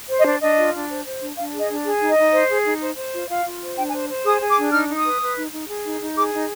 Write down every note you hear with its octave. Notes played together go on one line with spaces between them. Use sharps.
C5
D#5
D4
D4 D#5
F4
D4
C5
C5
D4
D4 F5
G#4
D#5
D4
G#4
D#4
D#5
D#4
C5
G#4
D#4
C5
C5
F4
F4 F5
F4
C5
D4 G5
G#5
C5
C5
G#4 D#6
G#4
D6
D4
D#4 F6
D#4
D#6
B4
B4
D#4
D#4
G#4
D#4
D#4
G#4 D6
D#4